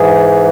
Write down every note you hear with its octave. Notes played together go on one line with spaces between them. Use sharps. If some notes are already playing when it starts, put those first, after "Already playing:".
Already playing: G#2 E3 G#4